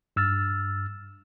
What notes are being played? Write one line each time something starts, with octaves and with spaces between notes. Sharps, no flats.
G2 E6 F6 A6